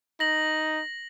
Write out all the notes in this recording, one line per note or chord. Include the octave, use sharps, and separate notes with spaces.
D#4 A#6 F#7